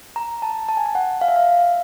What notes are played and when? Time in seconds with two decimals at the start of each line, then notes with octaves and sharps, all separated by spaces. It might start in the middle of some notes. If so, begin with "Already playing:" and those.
0.16 A#5
0.42 A5
0.69 A5
0.77 G#5
0.86 A5
0.95 F#5
1.21 F5
1.28 E5
1.36 F5